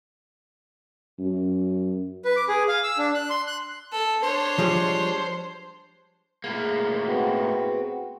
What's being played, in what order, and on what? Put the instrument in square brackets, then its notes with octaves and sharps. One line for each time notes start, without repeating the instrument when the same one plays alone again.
[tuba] F#2
[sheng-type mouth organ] B4
D6
G#4
F5
E6
D4
F#6
C6
F#6
[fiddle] A4
[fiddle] D4 C#5 [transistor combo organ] C5
[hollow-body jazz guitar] F3 G3 G#3
[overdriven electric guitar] A2 A#3 [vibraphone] G#4
[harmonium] B3 C4 F#4